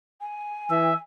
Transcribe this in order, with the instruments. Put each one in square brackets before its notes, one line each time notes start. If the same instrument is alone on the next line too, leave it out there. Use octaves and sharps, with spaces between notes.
[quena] G#5
[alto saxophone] E3 [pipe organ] E5